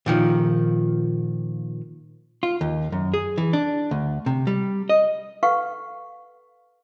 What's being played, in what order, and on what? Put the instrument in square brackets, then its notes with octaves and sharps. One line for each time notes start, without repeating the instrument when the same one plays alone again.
[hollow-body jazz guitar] A#2 D#3 F3
F4
D#2
F#2
G#4
E3
D4
D2
C3
G3
D#5
[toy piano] A4 B4 F5 F#5 C#6